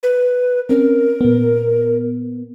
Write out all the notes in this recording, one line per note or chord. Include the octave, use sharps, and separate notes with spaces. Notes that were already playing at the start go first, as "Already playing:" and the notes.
B4
C4 C#4 A#4
A#2 B3